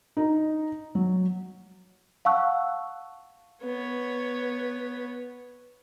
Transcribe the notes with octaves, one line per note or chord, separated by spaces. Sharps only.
D#4
F#3
F5 F#5 A5 C#6 E6 F#6
B3 C#5